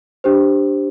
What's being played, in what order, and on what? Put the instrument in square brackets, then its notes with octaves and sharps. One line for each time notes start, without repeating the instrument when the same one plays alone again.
[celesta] D4 G4 C5